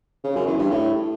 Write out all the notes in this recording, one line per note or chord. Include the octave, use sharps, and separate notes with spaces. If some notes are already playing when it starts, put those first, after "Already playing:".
C#3
F#2
E2
G2
A2